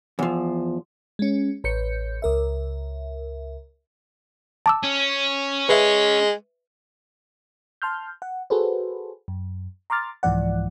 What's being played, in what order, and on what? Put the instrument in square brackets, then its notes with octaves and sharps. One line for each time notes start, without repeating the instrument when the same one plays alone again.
[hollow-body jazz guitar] E2 F3
[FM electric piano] G#3 C#4
A1 B4 C#5 G6 C#7
C#2 A#4 E5
[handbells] A5 D6 E6
[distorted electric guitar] C#4
[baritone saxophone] G#3 [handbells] B4 E5
[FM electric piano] A5 C6 F6 G6
F#5
F#4 G#4 A4 B4 C5
F#2
A#5 C6 D6 F6 A6
C2 G#2 E3 F3 D5 F#5